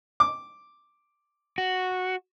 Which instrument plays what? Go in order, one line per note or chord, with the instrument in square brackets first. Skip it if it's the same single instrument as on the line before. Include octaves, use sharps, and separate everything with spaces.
[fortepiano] D6
[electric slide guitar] F#4